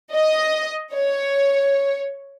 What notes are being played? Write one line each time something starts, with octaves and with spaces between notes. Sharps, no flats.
D#5
C#5